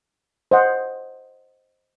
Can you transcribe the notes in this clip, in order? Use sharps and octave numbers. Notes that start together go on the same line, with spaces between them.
C5 D#5 F#5